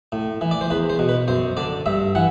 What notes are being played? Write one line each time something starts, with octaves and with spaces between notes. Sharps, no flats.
A2
E3
D5
C5
E2 B4
C5
B2
B4
F#2 C5
D3 D5
G2 E5
E3 F#5